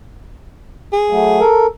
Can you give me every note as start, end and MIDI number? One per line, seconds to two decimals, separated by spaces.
0.93 1.52 68
1.10 1.40 54
1.10 1.40 57
1.40 1.67 69
1.40 1.67 70